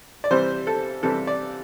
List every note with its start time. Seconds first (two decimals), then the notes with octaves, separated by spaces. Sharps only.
0.24 D5
0.31 C3 E3 G3 C5
0.67 A4
1.03 C3 E3 G3 A4
1.27 D5